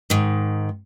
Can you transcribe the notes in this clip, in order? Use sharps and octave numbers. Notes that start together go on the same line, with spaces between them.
G#2 D#3